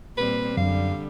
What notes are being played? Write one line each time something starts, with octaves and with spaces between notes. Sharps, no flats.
A#2 G3 C4 B4
F#2 D3 G3 F5